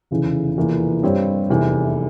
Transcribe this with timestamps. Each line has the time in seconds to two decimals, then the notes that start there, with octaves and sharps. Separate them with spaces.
0.11 F1 E2 C#3 E3
0.57 F1 E2 E3 A#3 F4
1.03 G2 G3 C4 G4 C#5
1.49 F1 E2 C3 E3